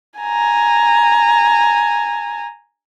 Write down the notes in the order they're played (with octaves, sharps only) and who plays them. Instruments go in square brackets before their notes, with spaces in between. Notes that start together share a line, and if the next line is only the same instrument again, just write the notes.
[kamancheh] G#5 A#5